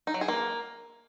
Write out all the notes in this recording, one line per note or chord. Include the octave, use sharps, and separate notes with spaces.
D#4
F#3
G#4
A#3